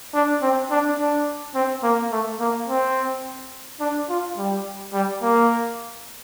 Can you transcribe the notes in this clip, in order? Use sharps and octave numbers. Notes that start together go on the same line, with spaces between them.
D4
C4
D4
D4
C4
A#3
A3
A#3
C4
D4
F4
G3
G3
A#3